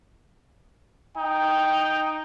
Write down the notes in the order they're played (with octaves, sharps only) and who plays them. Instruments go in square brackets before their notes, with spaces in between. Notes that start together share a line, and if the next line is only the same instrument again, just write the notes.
[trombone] D#4 [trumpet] G5